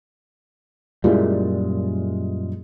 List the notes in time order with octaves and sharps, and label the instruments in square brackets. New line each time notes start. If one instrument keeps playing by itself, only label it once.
[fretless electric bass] F#2 A#2 G3 [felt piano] G#3 E4 F4